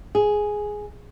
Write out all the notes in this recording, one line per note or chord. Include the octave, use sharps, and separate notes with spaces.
G#4